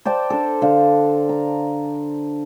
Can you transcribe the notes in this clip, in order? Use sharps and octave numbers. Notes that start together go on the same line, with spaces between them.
C5 D5 G5 A5
D4 A4
D3 F5
A#5